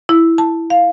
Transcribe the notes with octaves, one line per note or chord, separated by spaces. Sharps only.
E4
A5
F5